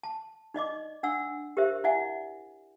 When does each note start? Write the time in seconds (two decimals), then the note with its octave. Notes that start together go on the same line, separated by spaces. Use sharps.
0.03 A5
0.54 D#4 D5 D#5 D6
1.03 D4 F#5 E6
1.57 G4 A#4 C5 E5
1.84 E4 D5 E5 F#5 G#5